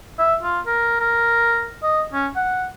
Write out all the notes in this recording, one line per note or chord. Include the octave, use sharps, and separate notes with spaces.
E5
F4
A#4
A#4
D#5
C#4
F#5